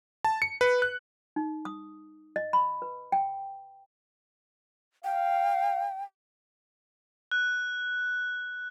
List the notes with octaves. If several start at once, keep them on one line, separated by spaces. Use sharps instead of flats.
A5
C#7
B4
F#6
D#4
D#6
D#5
B5
B4
G5
F5 G5
F#6